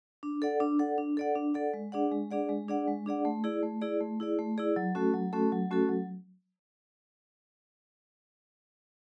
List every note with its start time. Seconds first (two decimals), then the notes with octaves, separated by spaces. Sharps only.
0.23 D4
0.42 A4 D5 F#5
0.60 D4
0.79 A4 D5 F#5
0.98 D4
1.17 A4 D5 F#5
1.35 D4
1.54 A4 D5 F#5
1.74 G#3
1.92 D4 G#4 D5 F#5
2.12 G#3
2.31 D4 G#4 D5 F#5
2.49 G#3
2.68 D4 G#4 D5 F#5
2.88 G#3
3.06 D4 G#4 D5 F#5
3.25 A3
3.44 E4 G#4 D5
3.63 A3
3.81 E4 G#4 D5
4.00 A3
4.20 E4 G#4 D5
4.39 A3
4.58 E4 G#4 D5
4.76 F#3
4.95 A3 C#4 F#4 A4
5.13 F#3
5.33 A3 C#4 F#4 A4
5.52 F#3
5.71 A3 C#4 F#4 A4
5.89 F#3